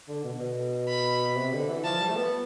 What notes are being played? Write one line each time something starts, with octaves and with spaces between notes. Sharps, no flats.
D3
B2
B2
B5
C3
D3
E3
F3 A5
G3
A3
B3